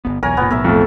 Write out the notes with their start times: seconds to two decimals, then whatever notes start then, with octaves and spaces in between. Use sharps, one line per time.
0.05 G1 D#2 B3
0.23 B1 E2 A#4 C#5 G#5
0.37 F1 A#2 B3
0.51 B1 A2 B3 A#4 E5
0.64 F2 A3